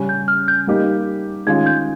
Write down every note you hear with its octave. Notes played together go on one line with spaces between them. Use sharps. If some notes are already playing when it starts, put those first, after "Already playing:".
Already playing: C#3 G3 C#4
G6
F6
G6
G3 A#3 D#4 G4
D#3 G#3 C#4 F4 G#6
G6